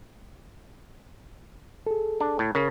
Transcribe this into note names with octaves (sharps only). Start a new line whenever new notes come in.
G#4 A4
D4
A2
C#3 A#4